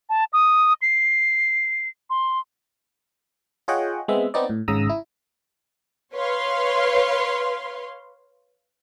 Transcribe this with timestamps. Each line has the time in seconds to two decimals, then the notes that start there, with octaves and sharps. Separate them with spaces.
0.10 A5
0.33 D#6
0.82 C7
2.10 C6
3.68 F4 G#4 C#5 D#5 F#5 G5
4.08 G#3 B3 C4 E5
4.34 B3 C4 D#4 D5
4.50 A2
4.68 G#1 G#2 C#3 A#5 D#6 E6
4.89 E4
6.16 B4 C#5 F5 C6